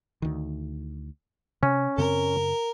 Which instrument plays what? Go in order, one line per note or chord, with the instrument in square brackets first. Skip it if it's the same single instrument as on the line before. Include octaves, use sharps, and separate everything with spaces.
[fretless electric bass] D2 D#3
[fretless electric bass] C3 [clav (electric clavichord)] C#4
[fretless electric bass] F#2 C#3 C4 [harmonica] A#4